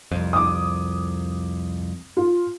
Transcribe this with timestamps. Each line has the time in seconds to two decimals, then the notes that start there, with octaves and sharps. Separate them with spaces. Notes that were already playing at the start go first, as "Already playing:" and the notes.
0.12 C2 F2
0.33 D6 D#6
2.17 F4